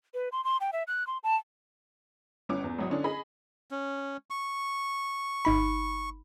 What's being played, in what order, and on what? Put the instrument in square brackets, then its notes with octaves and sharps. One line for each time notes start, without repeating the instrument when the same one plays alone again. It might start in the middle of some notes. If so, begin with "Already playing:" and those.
[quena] B4
C6
C6
G5
E5
F#6
C6
A5
[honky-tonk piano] G1 C#4 D6
E2
G#1 F#3 D#6
D3 C#4 D4
G#4 D#5 B5
[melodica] C#4
C#6
[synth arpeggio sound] G1 D#4 B5